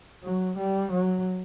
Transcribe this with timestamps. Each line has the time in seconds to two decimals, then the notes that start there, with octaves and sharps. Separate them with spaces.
0.24 F#3
0.58 G3
0.91 F#3